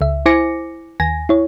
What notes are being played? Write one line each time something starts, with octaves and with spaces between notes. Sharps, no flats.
C#2 E5
E4 C5 G#5 D6 A#6 C#7
D#2 G#5 A#6
E4 C#5